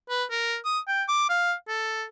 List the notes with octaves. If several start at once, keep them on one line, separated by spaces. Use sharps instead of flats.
B4
A#4
D#6
G5
D6
F5
A4